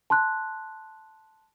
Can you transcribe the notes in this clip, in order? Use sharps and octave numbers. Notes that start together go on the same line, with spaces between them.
A5 C6 F#6